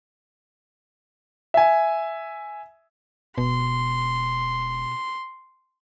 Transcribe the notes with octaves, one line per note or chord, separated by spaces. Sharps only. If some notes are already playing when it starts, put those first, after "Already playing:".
E5 G#5
E1 B2 C6